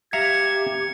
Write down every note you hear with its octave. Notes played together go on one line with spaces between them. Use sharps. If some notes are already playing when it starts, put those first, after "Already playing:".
G4 E5 F5 A#5 G#6 C#7